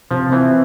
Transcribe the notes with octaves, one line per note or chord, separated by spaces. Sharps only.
C3 F3
E3 C4